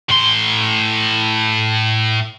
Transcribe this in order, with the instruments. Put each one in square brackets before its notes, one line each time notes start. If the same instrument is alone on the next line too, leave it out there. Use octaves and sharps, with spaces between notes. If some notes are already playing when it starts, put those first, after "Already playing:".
[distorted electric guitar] A2 C6